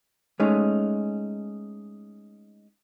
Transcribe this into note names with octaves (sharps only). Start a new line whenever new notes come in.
G#3 A3 C#4 D#4